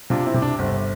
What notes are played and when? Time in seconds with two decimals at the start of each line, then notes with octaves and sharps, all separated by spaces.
0.10 C3 D4 F4
0.26 C4 E4
0.34 C3
0.42 D4
0.59 G1 C4